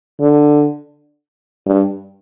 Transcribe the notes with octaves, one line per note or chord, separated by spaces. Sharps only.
D3
G2